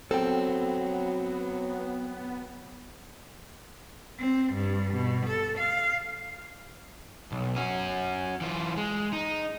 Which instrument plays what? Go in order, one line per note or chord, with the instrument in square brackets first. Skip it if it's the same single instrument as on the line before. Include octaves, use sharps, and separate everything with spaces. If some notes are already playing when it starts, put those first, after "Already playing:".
[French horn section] F#3 [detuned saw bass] B3 [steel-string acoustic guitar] C4 [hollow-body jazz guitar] A4 G5
[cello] C4
G2
B2
A4
F5
[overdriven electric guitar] B1
C#4 F#4
E3 F4
G#3
D#4